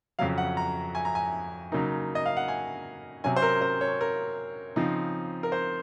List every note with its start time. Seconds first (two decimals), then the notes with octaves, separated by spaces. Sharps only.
0.19 F2 C#3 F#3 F5
0.38 F#5
0.57 A#5
0.95 G#5
1.05 A#5
1.15 G#5
1.72 C#3 F#3 A#3 D#4
2.15 D#5
2.26 F5
2.37 F#5
2.48 G#5
3.24 C3 F#3 C#4 G#5
3.36 C5
3.42 A#4
3.61 C5
3.81 C#5
4.01 A#4
4.76 C#3 F3 C4 D#4
5.43 A#4
5.52 C5